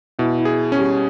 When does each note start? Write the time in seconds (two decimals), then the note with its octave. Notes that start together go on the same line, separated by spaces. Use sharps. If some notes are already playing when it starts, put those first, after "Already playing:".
0.19 B2 E4
0.39 E4
0.45 G#4
0.72 C#4
0.79 G3